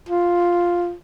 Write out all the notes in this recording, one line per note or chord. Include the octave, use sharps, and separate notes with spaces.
F4